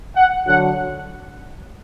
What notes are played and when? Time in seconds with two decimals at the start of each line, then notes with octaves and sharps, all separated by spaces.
0.16 F#5
0.47 D3 F#3 F#5